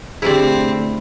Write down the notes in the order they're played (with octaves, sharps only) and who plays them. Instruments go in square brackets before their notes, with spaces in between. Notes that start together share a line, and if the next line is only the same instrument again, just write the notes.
[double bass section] D3 A3 [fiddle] C4 [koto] E4 D5 [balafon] G4 G#4